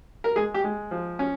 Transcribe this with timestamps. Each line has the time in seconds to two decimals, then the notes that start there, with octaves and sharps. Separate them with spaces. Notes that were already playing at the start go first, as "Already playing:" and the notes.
0.24 A#4
0.36 G#3 G#4
0.54 G4
0.64 G#3
0.91 F3
1.19 C#4